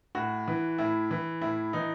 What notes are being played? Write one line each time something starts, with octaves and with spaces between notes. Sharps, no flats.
A2 F#4
E3
A2 E4
E3
A2 E4
E3 D#4